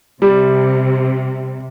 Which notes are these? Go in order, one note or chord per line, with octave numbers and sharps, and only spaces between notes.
C3 G3